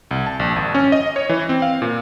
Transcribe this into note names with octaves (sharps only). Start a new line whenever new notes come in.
C2
A5
A#1
G#1
C#4
D#5
C#5
E3
C4
F5
A#2